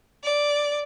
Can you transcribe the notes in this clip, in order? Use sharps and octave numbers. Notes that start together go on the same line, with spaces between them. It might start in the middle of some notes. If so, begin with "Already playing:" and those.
D5